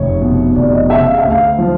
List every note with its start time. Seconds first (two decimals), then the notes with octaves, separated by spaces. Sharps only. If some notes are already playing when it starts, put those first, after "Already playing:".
Already playing: F1 C#5
0.21 B2
0.55 F1 D5
0.73 D#5
0.90 C#3 E5
1.07 F5
1.18 E5
1.25 D2
1.30 F5
1.59 F3